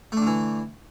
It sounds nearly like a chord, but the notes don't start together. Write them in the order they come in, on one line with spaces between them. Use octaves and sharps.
A3 D4 D3 E3